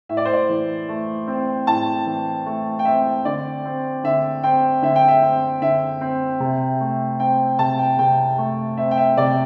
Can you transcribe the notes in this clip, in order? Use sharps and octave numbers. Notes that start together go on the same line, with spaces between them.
A2 E5
D5
C5
D5
E3
A3
C4
A2 A5
E3
A3
G5
C4 E5
D3 D5
C4
D3 E5
C4 G5
D3 E5
G5
E5
C4
D3 E5
C4
C3
A3
C4 G5
C3 A5
G5
C3 G5
A3
C4 E5
G5
E5
C3 D5